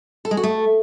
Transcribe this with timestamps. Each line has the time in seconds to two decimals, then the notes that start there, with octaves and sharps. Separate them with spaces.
0.25 A4
0.31 G#3
0.37 F#4
0.44 A3